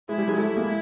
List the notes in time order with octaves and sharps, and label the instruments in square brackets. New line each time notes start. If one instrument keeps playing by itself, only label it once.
[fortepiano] G#3 [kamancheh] E4
[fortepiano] G3
F#3 G#3
[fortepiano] G3 A3 [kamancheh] E4
[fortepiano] G#3 A#3